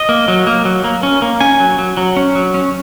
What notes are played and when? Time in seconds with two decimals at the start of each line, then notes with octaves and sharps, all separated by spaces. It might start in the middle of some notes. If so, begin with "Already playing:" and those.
Already playing: D#5
0.09 A#3
0.28 F#3
0.47 A#3
0.65 F#3
0.84 A#3
1.03 C#4
1.22 A#3
1.41 C#4 G#5
1.60 F#3
1.79 F#3
1.97 F#3
2.17 C#4
2.35 F#3
2.54 C#4